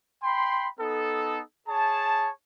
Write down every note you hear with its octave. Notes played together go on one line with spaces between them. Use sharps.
G5 B5 C6
B3 D#4 A4
G#4 C#5 A5